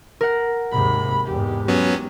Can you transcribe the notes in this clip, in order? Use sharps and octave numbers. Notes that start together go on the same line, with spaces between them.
A#4 F#5
D#2 G#2 C3 B5
E2 G#2 G4
F#3 B3 C#4